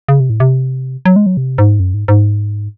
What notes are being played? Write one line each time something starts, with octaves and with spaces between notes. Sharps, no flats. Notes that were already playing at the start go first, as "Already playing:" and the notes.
C#3
C3
A2
C3
F#3
G#3
F#3
C3
G#2
F#2
G#2
G#2